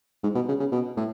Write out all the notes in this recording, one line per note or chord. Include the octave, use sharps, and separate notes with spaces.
G#2
B2
C#3
C#3
B2
A2